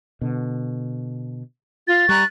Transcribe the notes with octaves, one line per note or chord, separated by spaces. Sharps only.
B2 D3
F4 A6
G3 A#5 C#6 F#6